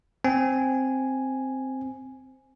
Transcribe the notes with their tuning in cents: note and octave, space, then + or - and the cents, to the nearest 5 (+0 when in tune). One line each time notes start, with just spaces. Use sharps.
C4 +0 G#5 +0